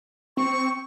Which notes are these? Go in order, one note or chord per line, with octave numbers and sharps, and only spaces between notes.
C4 C#6